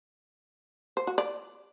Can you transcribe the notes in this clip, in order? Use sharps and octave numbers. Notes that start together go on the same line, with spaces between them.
C5
F#4
D5